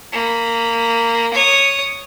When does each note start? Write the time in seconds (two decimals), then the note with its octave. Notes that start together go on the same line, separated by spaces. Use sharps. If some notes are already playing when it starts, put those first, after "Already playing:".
0.12 A#3 B5
1.33 C#5 D#6